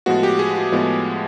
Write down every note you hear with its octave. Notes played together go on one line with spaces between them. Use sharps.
A2 F3 G#3 B3 F#4
G4
G#4
F#4
A2 F3 G#3 B3